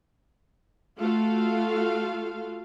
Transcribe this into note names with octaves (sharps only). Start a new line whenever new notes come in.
A3 F4 F#4 A4 F5